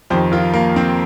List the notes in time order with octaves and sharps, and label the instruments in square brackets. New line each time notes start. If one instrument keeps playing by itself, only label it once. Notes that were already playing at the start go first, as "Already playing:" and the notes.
[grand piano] F2 D#3 G4 C5
F4 A#4
A#3
C4